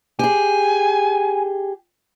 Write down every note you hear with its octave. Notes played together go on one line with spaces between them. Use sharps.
G4 G#4 G#5